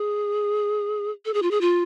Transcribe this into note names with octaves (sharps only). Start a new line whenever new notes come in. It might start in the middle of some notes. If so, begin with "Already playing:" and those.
Already playing: G#4
A4
G#4
F4
G#4
F4